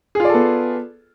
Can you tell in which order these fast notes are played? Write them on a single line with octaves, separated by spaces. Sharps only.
G#4 F4 D5 A4 B3